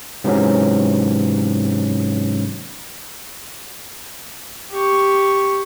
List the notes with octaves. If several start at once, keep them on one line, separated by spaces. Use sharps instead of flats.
G#2 C3 E3 F#3 C#4
G4 C#6